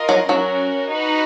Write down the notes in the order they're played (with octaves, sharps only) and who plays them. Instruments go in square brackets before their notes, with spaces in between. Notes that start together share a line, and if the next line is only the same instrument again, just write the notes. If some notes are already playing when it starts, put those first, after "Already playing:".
Already playing: [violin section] F4 A#4 D#5
[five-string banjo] F#3
[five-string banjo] F#3 [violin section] C#4 F#4 A#4
[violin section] D#4 F#4 B4